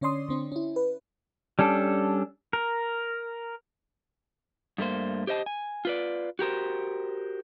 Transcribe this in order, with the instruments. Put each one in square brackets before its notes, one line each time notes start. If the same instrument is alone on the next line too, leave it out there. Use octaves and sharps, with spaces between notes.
[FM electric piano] D3 C#4 C#5 D5 C6 D#6
D3 C4 D4
C#4 E4
B4
[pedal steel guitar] G3 C#4 D4 A4
A#4
[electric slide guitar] G2 A3 A#3 C5
G4 C5 D#5 A5
G#5
F4 B4 D5
F#4 G4 A#4 C5